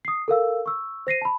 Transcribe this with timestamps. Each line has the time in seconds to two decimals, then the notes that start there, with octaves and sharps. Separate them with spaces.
0.05 D#6 C7
0.28 A4 A#4 F5 E6
0.66 C#6 E6
1.07 C5 A#6 C7 D#7
1.22 A5 B5